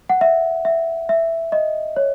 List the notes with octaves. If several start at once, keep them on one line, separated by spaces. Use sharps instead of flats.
F#5
E5
E5
E5
D#5
C#5